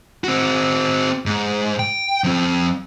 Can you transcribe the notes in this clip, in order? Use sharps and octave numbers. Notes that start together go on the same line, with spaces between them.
C4 F#4
G#2
G5
F3 C4